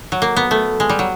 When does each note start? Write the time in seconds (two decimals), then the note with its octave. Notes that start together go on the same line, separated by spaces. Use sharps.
0.12 F#3
0.22 A#3
0.36 B3
0.51 A3
0.80 G#3
0.89 G3
0.99 F#3